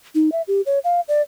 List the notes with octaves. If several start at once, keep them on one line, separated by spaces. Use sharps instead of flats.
D#4
E5
G4
C#5
F5
D5